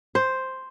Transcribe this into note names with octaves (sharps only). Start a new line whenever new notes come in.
C5